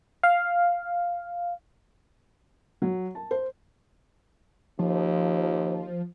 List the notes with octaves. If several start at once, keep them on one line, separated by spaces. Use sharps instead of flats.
F5
F#3
A5
C5
D#2 F3